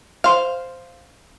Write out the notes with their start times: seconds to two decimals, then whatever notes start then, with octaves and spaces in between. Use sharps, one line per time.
0.24 C5 F5